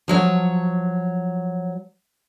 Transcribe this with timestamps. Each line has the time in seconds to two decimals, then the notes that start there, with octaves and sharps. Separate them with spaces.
0.08 F3 F#3 C#5